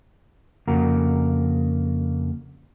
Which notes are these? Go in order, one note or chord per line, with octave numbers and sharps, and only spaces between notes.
F2 C#3 A#3 F#4 A#5